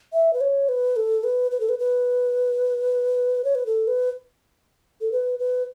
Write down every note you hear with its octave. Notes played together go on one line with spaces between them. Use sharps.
E5
B4
C#5
B4
A4
B4
B4
A4
B4
B4
C#5
B4
A4
B4
A4
B4
B4